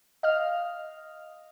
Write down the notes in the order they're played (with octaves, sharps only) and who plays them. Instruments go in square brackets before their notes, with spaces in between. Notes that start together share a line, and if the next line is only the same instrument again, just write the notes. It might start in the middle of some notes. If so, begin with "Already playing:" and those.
[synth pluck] D#5 F5 F6